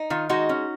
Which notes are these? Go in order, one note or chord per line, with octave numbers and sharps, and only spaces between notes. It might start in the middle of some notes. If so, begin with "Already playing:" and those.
Already playing: D#4
D#3 F4
G#3 D#4 F#4
C#4